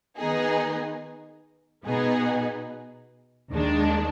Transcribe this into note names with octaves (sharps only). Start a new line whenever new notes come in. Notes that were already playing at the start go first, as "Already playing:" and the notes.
D#3 B3 D#4 G#4
B2 B3 D#4 G#4
D#2 D#3 G#3 D4